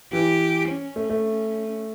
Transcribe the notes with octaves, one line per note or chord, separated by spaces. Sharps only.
E3 G4
C#4
A3
A3
C#4